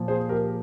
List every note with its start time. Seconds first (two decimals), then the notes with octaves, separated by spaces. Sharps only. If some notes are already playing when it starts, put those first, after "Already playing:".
Already playing: A#2 F3
0.08 G#4 C5
0.29 G4 A#4